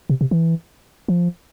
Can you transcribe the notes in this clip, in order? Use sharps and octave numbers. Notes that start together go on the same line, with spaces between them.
C3
C3
E3
F3